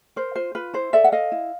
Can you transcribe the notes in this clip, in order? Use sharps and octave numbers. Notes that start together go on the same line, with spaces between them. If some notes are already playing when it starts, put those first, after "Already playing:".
A#4 C5
F4 C5
F4 B4
E4 C5
A4 D5 E5
F#5
A4 D#5 F5
E4